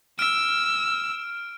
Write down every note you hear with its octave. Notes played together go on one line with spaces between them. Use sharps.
E6 F6 D7